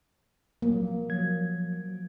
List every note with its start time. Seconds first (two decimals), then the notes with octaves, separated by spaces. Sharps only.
0.62 F3 F#3 A#3
1.09 F3 F#3 G#6